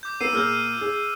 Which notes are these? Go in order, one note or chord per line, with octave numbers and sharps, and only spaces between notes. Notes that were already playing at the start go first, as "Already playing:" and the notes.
D6 G6
B3 A#4 E6 C7 D#7
A#2 G#4 A#4 E6 F6 G6
G#4